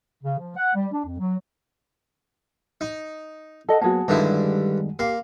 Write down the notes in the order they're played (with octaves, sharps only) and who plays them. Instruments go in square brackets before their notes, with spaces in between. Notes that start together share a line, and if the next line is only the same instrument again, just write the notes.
[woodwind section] C#3
F3
F#5
G3
D4
F2
F#3
[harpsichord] D#4
[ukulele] A4 D#5 F#5
[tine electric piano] F#3 A#3 B3 [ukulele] F#4 G#4 A5
[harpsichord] G2 D3 E4 [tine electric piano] D#3 G3 G#3
[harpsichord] A#3 C6 [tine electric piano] G4